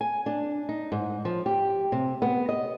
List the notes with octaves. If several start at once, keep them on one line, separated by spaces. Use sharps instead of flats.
G#5
D4
D#4
G#2
F3
G4
C3
B3
D#5